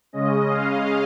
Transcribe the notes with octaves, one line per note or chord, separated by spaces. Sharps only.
C#3 G#3 C#4 D#5
F5